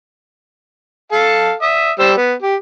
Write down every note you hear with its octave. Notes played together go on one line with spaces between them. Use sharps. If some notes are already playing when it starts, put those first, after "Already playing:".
A4 F5 A5
E5 D#6
G3 C5 E6
B3
G4